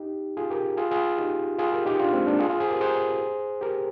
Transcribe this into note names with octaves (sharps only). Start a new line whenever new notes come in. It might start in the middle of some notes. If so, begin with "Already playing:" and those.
Already playing: D#4 G4
F4 G#4
G4 A#4
F4 G#4
F4 G#4
D#4 G4
F4 G#4
G4 A#4
D#4 G4
D4 F4
G#3 C4
A#3 D4
F4 G#4
F4 G#4
G#4 C5
G4 A#4
G#4 C5
G4 A#4